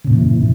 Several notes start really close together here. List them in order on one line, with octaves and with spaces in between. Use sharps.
C#3 A#2 F#2 E3